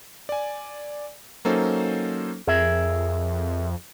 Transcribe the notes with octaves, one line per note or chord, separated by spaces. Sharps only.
D5 G#5
F#3 A#3 C#4 D#4 A4 C5
F2 G#4 A#4 E5